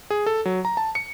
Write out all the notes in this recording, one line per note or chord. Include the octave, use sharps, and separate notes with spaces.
G#4
A4
F#3
A#5
A5
C#7